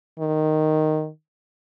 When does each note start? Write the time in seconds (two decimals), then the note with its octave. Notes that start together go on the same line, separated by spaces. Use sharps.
0.19 D#3